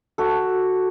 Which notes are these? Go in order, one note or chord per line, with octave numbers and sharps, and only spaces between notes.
F#4 A4